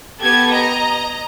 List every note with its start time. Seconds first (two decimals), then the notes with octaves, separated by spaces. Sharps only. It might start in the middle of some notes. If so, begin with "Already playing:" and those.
0.21 B3 G4 A4 G#6
0.52 D#5 A#5